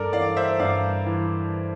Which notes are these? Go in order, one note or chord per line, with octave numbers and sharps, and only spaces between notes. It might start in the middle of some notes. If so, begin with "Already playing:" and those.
Already playing: G2 A4 A#4 D5
E3 D5 F5
C5 E5
G2 D5 F5
E3